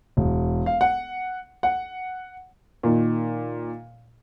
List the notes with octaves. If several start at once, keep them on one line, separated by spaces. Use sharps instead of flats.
E1
F5
F#5
F#5
A#2 D#3